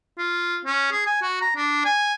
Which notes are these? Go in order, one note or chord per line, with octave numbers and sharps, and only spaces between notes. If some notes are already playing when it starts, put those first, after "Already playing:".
F4
C#4
G#4
G#5
F#4
A#5
D4
G#5